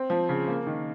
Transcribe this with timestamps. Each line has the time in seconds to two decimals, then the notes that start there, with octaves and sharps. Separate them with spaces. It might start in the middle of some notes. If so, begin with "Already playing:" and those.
Already playing: C4
0.10 F3
0.29 C#3
0.48 A#3
0.67 D#3